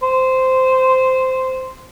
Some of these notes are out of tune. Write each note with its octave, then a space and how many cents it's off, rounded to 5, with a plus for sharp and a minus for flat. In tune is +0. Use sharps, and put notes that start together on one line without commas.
C5 -10